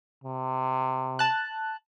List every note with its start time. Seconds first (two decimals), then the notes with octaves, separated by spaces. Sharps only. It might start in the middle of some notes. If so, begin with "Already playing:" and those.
0.24 C3
1.19 A5 F#6